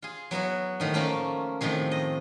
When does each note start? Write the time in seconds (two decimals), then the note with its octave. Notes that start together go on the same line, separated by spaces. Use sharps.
0.02 F4 G#4
0.31 F#3 B3 E4 F#4
0.80 A2 D#3 F3
0.94 A3 A#3 C#4 F4
1.61 A2 C3 D#3 F3 G#4
1.91 D#5